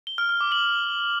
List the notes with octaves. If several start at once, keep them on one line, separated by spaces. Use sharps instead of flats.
G7
F6
F6
D6
F#7